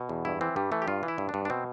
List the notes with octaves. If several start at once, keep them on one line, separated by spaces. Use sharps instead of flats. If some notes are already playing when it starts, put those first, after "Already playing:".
Already playing: B2
E2
G2 E4
E3 C4
G2 G3
E3 A3
G4
G2 F4
E3
E4
G2
D4
G2
D4
B2 C4